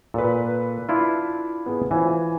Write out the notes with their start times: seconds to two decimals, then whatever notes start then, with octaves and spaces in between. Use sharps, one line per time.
0.14 A#2 A4 B4
0.89 D4 E4 F4
1.66 B3 G#4
1.91 E3 F4 C5 G#5